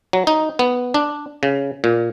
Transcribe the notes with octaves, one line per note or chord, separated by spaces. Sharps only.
F#3
D#4
B3
D4
C#3
A#2